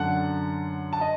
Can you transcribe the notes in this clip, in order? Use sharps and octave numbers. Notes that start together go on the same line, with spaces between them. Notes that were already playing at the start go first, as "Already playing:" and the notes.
Already playing: F#2 D3 F#5 A5
A5
D#5